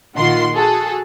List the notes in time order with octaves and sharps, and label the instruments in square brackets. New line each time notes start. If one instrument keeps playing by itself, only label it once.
[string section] A#1 D#3 F4 F#5 C6
F#4 G#4 A4